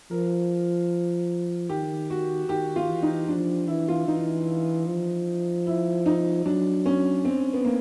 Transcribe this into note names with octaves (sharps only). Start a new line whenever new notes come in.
F3 A#4
D#3 G4
F#4
D#3 G4
F4
E3
D#4
F3 D4
E3 E4
F4
E3 D#4
F3
E4
D#4
F#3 D4
C#4
C4
B3
A#3